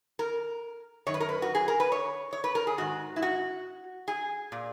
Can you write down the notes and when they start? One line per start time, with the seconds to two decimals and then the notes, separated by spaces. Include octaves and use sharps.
0.19 A#4
1.07 F#2 D#3 C#5
1.14 B4
1.20 A#4
1.29 B4
1.42 F#4
1.55 G#4
1.68 A#4
1.80 B4
1.92 C#5
2.33 C#5
2.44 B4
2.55 A#4
2.67 G#4
2.78 G#2 D#3 F#4
3.16 E4
3.22 F#4
4.08 G#4
4.52 A#2